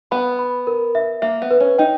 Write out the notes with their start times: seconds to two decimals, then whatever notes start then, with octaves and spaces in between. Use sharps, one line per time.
0.11 B3 B5
0.39 B5
0.67 A#4
0.95 E5
1.22 A#3 E5
1.42 B3
1.51 B4
1.60 C#4
1.78 D#4 G5